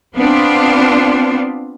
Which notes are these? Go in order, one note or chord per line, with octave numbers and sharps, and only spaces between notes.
B3 C4 D4 F4